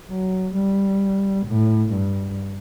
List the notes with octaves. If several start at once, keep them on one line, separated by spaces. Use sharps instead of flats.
F#3
G3
A2
G2